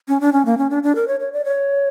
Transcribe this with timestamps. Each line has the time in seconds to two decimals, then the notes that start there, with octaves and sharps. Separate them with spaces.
0.08 C#4
0.21 D4
0.33 C#4
0.46 A#3
0.58 C#4
0.70 D4
0.83 D4
0.95 A#4
1.08 C#5
1.20 C#5
1.32 D5
1.45 C#5